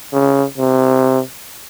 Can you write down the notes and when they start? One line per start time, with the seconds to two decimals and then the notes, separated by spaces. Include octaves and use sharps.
0.13 C#3
0.58 C3